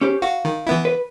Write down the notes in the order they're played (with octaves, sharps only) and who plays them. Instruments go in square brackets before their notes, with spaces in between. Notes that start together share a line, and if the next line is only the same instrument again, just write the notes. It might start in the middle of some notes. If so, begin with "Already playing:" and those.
[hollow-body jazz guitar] C#4 G4 C5
[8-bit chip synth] F#4 [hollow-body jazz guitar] F5
[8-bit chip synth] D#3
E3 B3 E4
[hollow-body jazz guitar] B4